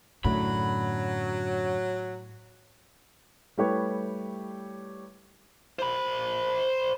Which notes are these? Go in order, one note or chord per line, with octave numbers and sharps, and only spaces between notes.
F#2 A2 D3 F#3 B5
G3 A3 E4 G4 B4 C#5
C5 B5